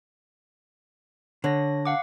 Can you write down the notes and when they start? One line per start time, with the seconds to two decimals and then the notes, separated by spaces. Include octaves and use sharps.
1.44 D3 C#5 A#6
1.85 F5 F#5 D6